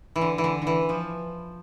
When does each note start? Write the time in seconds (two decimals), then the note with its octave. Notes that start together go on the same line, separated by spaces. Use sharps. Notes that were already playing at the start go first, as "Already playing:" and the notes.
0.16 E3
0.21 D3
0.38 E3
0.44 D3
0.62 D3
0.67 E3
0.89 F3